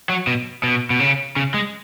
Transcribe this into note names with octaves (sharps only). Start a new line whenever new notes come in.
F#3
B2
B2
B2
C#3
C#3
G#3